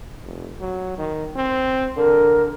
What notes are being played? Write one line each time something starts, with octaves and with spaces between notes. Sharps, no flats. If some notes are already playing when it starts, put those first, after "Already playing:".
F1
F#3
D#3
C4
D3 A#4